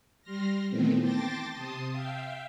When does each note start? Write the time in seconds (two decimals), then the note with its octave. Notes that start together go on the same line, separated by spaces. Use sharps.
0.22 G3 C6 F6 A#6
0.70 A#2 D#3 E3 A3 B3 C4
0.99 G5 A5 C6 D6 A6 A#6
1.52 C3 A5 C6 D#6
1.91 E5 F5 G5